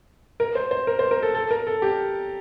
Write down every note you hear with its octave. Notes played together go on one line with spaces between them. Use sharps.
A#4
C5
C5
A#4
C5
A#4
A4
A4
A#4
A4
G4